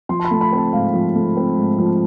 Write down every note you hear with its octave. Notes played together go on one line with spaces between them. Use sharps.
F3 C6
A5
B5
A3 A5
B5
C4
A5
G#2 F5
F3
A3
C4
G#2
F3